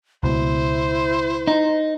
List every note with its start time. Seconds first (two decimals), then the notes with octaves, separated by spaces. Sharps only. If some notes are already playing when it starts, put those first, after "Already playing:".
0.23 C#2 B2 E4 C5
1.47 D#4